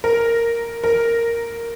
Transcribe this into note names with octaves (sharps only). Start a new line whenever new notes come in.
A#4
A#4